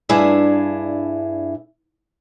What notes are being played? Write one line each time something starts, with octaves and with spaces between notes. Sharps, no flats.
G2 D4 E4 G#4 E5